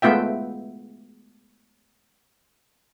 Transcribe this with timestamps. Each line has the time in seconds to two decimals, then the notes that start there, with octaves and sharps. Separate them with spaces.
0.02 G#3 A3 B3 F4 E5 G5